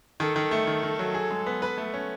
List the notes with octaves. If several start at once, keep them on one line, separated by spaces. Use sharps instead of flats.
D#3 A4
D#3
A3
D#3
D#3
F#3
G#4
G#3
B3
B4
A3
C#4